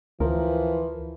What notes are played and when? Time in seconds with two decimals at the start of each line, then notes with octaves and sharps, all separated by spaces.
0.20 D2 E3 F3 A#4